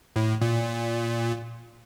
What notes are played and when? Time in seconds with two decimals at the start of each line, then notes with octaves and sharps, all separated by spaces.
0.16 A2
0.41 A#2